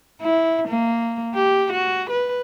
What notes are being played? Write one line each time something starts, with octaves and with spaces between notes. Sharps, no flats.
E4
A#3
G4
F#4
B4